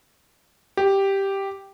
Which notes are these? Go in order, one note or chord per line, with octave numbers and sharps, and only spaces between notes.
G4